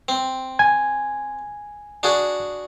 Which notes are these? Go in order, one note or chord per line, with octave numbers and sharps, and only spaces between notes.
C4
G#5 G#6
D4 F#4 G#4